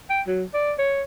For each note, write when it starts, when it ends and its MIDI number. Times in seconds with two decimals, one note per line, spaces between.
0.10 0.22 79
0.27 0.44 54
0.54 0.73 74
0.79 1.02 73